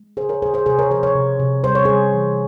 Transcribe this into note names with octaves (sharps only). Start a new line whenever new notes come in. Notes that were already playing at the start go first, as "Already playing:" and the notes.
Already playing: G#3
C#3 G#4 C5
A#4 C#5
C#3 G#4 C5
G#4 C5
C3 G#4 C5
A#4 C#5
F3 G#4 C5
A#4 C#5
C3
C3
G3 C5
C#5
G3 G#4 C5
E3